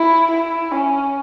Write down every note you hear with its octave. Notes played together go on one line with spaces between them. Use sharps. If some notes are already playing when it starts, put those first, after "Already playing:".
Already playing: E4
E4
C#4